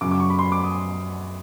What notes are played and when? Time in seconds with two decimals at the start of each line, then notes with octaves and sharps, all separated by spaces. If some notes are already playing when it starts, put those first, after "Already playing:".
0.01 F#2 C#3 F#3 D6
0.11 D6
0.20 C#6
0.30 B5
0.39 C6
0.52 D6
0.64 D#6